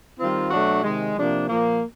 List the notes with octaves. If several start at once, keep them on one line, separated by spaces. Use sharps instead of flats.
D#3 G3 C4 F4
B2 F#3 A3 D4 F#4
C3 D#3 G#3
C3 F3 A#3 D4
A#2 F3 A#3